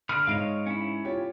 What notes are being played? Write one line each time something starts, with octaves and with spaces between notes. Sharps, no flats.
D3 B5 F6
G#2 C#5 D#5 F5 D7
C#4 E4
F4 G4 C#5